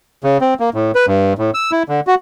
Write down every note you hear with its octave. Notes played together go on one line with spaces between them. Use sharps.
C#3
C4
A#3
A2
B4
G2
A2
E6
E4
D3
F#4